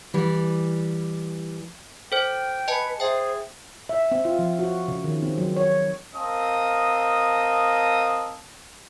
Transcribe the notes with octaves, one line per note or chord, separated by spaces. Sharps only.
E3 G3
A4 C5 G5
B4 D#5 G#5 A5
G#4 C5 E5 G5
E5
C4
F4
F3
F#4
C#3
D#3
C4
F#3
C#5
C4 A#4 D#5 F5 A5 D#6